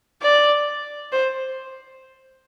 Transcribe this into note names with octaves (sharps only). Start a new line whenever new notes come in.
D5
C5